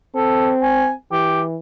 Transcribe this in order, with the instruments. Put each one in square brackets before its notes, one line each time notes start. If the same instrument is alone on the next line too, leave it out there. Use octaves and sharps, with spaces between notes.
[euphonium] C4 [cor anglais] A4
[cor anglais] G#5
[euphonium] E3 [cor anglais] G4